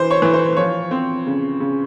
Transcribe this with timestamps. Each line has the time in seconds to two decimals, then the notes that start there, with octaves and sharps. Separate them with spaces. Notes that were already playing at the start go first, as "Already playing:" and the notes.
Already playing: E3 C5
0.10 C#5
0.22 E3
0.33 C5
0.56 F3 C#5
0.91 C4
1.27 C#3
1.60 C#3